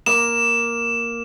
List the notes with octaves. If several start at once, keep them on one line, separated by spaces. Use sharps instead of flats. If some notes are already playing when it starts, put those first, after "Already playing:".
A#3 E7